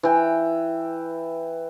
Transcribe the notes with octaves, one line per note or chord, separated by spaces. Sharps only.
E3 G5